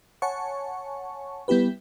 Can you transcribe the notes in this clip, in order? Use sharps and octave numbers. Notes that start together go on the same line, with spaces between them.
C#5 F#5 G#5 A5 C#6
G3 B3 E4 G4 B4